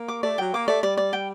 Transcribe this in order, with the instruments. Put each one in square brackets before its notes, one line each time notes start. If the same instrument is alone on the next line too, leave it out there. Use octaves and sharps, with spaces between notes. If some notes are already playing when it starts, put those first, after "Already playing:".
Already playing: [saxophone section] A#3
[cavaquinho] D6
[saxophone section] A3 [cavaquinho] D5
[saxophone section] F#3 [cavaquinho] G5
[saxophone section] A#3 [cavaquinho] D6
[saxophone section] A3 [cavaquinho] D5
[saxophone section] G3 [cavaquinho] D5
[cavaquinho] D5
G5